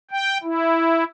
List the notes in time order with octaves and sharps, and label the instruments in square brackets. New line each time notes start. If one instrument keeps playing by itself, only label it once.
[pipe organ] G5
E4